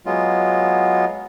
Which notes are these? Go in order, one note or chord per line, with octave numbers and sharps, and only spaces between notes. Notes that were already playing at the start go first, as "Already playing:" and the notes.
F#3 G#3 B3 F4